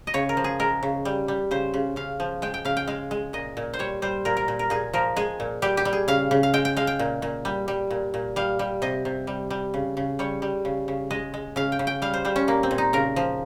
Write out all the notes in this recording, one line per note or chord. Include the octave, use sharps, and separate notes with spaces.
D#5
C#3 C#5
A#4
F3
G#4
G#3 A#4
C#3
G3
G3
C#3 C5
C#3
C#3 F5
F3
G#3 G5
G5
C#3 F5
G5
G#3 F5
G#3
A#2 D#5
A#2
C5
G3 C#5
G3 C5
A#2 A#4
A#4
A#2
A#4
A#2 G#4
F3 A#4
G#3 G#4
A#2
G3 G4
G4
G3
G#4
C#3 F5
C#3
F5
G#3 G5
G5
G#3 F5
G5
A#2
A#2
G3
G3
A#2
A#2
G3 F5
G3
C3 D#5
C3
G3
G3
C#3
C#3
G3 C#5
G3
C#3
C#3
G#3 D#5
G#3
C#3 F5
G5
C#3
G5
G3 F5
C5
G3 C5
C#4
A#2 A#3
C4
A#2
D#4
C#3 A#4
F3